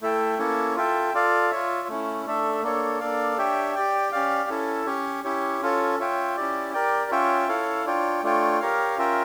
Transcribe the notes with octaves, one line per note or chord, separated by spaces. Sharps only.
A3 E4 A4 E5 G5
A#3 C#4 E4 A4 C#5
F4 A4 E5 G5
F4 A4 D5 F5
F4 C#5 E5
A3 C#4 E4
A3 D4 A4 E5
A#3 D4 A4 C#5
A#3 D4 A4 D5 F5
D4 G4 C#5 E5 G5
G4 D5 G5
C#4 G4 D5 F5
C#4 E4 A4
C#4 G4 C#5
C#4 E4 G4 C#5
C#4 F4 A4 C#5
F4 C#5 E5 G5
C#4 E4 G4 D5
G4 A#4 D5 G5
C#4 F4 C#5 E5 G5
E4 A4 C#5 F5
D4 F4 C#5 G5
A3 D4 F4 C#5 G5
G4 A#4 C#5 F5
C#4 F4 A#4 E5 G5